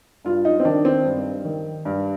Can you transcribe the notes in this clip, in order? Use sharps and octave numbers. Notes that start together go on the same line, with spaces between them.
G2 F4
D#4
C4
D#3 D4
C4
G2
D#3
G2